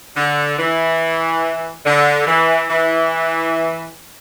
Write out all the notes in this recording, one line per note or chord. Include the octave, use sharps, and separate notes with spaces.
D3
E3
D3
E3
E3